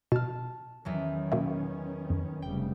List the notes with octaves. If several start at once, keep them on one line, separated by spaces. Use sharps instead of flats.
B2 A5 F6
E2 D#3 E3 F#3 C#4
B2 A#3 E5
F2
F1 C#3 G3 G5